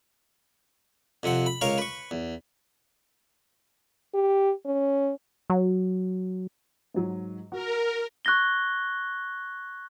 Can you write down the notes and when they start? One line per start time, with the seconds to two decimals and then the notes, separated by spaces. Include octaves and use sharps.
1.23 F2 C3 C4 F#5
1.46 B5
1.61 C#2 A#4 C#5 F5 C#6
1.78 B4 C#6
2.11 E2
4.14 G4
4.66 C#4
5.50 F#3
6.94 G#2 F#3
7.52 F#4 A#4
8.25 C#6 F#6 G#6 A#6 G7